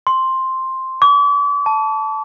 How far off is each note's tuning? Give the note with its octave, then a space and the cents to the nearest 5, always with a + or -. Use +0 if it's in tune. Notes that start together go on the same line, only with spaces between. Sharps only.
C6 +5
D6 -45
A5 -10